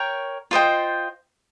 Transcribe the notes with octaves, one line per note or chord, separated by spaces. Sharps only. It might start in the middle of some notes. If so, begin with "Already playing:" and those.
Already playing: A#4 C#5 G5
F4 C5 D#5 G5